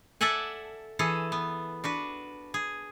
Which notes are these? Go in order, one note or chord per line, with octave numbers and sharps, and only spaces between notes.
A4 D5 E5 F#5 G#5
E3 G#4 A4
B3
D4 F#4 B4
G#4